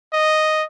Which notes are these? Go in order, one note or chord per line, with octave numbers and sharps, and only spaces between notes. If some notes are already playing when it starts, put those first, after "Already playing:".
D#5